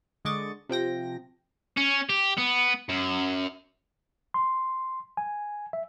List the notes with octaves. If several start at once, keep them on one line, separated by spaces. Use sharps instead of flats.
D3 G#3 D#5 C#6 D6 A6
C3 F3 G5 A#6
C#4
G4
B3
F#2
C6
G#5
E5